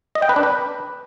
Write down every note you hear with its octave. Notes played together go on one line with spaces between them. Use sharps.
D#5
G5
B4
D4
B4